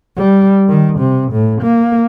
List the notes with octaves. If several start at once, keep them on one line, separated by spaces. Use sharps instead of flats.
G3
D#3
C3
A2
A#3